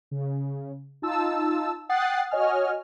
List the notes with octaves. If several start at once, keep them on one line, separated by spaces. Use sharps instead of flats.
C#3
D#4 F4 A5 E6
F#5 G5 D#6 F#6 A6 C7
F#4 C#5 D#5 G#5 F6